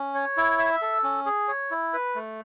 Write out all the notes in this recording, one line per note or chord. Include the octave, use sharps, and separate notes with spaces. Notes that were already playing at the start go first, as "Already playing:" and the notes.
Already playing: C#4
C#5
E4
E5
A4
C#4
G#4
C#5
E4
B4
A3